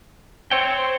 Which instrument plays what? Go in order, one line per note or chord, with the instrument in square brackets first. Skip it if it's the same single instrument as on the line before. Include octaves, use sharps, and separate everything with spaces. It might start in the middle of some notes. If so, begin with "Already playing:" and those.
[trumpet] C4 [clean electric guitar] C5 C#5 G5